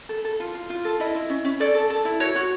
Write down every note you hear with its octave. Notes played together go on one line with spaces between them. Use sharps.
A4
A4
F4
F4
F4
A4
E4 D#5
E4
C#4
C#4
A4 D5
A4
A4
E4
F#4 C#5
F#4